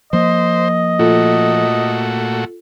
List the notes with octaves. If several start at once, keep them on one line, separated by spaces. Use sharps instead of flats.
F3 A#3 C5 D#5
A#2 A3 F4 F#4 A4